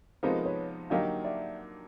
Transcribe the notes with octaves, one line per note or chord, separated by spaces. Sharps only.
C3 F3 G#3 B3 D#4 A#4 C5
B4 C#5
D3 F#3 A#3 D#4 G4 D#5 F5
D5 E5